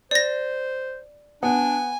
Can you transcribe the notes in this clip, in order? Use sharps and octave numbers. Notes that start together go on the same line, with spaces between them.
C5 D5 A#6
B3 D4 G#5